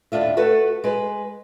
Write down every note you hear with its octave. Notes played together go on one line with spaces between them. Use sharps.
D#2 A2 D4 F4 E5
A3 F#4 A4 B4
G#3 B4